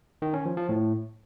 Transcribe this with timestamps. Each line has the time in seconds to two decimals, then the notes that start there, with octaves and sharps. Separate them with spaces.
0.22 D#3
0.34 C#4
0.45 F3
0.57 F3
0.69 A2